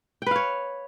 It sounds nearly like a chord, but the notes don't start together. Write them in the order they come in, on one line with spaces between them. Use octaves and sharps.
G5 B4 F5 C#5